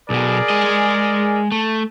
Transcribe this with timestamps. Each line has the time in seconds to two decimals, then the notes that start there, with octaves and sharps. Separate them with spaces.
0.10 B1 B2 G#4 A#4 D5
0.49 G#3 D#5
1.52 A3